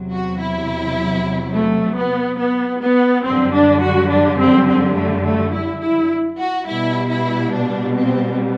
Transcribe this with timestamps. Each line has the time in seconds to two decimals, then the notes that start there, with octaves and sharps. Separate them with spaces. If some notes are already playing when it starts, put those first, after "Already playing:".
Already playing: E2 C3 F#3
0.12 F#4
0.40 E4
1.54 A3
1.96 B3
2.40 B3
2.82 B3
3.25 F#2 D3 G3 C4
3.53 D4
3.83 F#4
4.10 D4
4.39 C4
4.68 C4
4.96 A3
5.25 A3
5.53 E4
5.82 E4
6.38 F#4
6.67 B2 G3 E4
7.10 E4
7.53 D4
7.95 C4